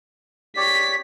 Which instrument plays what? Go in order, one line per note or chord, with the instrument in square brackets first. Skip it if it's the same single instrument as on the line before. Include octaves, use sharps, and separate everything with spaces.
[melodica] G4 C#5 D5 [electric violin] B6